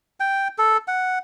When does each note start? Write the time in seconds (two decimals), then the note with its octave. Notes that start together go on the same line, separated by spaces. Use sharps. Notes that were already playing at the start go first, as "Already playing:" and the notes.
0.20 G5
0.58 A4
0.88 F#5